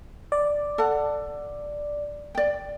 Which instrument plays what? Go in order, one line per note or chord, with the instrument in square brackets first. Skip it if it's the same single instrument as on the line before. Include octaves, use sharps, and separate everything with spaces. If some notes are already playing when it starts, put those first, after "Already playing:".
[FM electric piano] D5
[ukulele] A4 F#5
D5 G5